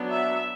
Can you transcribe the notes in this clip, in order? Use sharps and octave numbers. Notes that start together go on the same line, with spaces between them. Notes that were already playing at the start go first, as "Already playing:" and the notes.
Already playing: F#3 B3 D4
E5